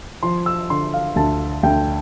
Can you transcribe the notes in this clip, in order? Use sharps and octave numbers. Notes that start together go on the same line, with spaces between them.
F3 C6
E6
D3 C6
F5
D2 A5
D2 G5